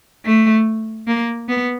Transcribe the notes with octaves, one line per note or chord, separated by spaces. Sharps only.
A3
A#3
B3